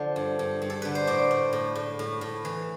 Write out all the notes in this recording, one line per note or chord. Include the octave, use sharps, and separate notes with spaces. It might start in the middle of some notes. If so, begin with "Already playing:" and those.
Already playing: D3 F3
G2
G2
G2
A4
D3 B4
C5
A2 D5
A2
A2
A2
A2
A2
E3